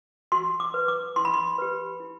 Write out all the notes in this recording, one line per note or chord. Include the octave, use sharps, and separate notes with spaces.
F#4 C6
D6
B4
D6
E4 C6
B5
C6
G4 B4
E4